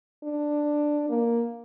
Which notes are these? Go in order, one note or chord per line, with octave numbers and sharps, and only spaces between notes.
D4
A#3